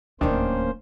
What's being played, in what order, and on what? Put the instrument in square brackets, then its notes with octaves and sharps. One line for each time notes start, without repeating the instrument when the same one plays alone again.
[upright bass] D1 D#2 [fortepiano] D#3 D4 [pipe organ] A#3 C#4 C5